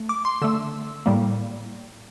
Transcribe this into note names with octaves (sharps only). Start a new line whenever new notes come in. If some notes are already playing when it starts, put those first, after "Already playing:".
Already playing: A3
D6
C6
D3 A3 E6
A2 G3 A#3